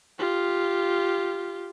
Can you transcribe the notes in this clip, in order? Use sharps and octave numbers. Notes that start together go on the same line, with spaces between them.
F4 G4